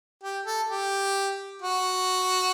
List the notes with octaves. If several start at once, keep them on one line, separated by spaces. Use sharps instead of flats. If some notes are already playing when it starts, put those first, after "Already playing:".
G4
A4
G4
F#4